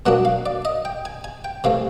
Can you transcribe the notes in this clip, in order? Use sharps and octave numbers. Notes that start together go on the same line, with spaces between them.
B2 F#3 A#3 D4 F#5
F5
D5
D#5
G5
G#5
G#5
G5
C3 E3 A3 F5